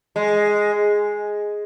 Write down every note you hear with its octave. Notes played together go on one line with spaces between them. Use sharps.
G#3